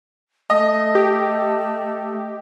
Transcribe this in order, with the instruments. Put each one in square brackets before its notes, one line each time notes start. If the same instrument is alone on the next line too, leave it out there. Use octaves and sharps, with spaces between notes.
[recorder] A3 [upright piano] D#5
[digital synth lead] G4